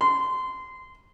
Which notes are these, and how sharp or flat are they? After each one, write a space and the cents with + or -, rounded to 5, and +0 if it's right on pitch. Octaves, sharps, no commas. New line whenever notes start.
C6 -20